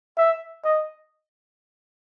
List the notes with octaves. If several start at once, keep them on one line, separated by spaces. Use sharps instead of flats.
E5
D#5